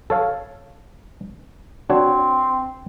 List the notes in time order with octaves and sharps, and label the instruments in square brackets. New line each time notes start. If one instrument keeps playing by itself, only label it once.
[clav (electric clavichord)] A4 C#5 F5
[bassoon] C4 [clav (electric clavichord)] D4 F#4 C#5